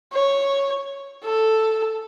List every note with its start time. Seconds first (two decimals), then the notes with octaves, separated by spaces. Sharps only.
0.13 C#5
1.24 A4